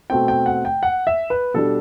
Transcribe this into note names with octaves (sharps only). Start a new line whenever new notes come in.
B2 A3 C4 G5
G5
F#5
G5
F#5
E5
B4
B2 G3 D4 A4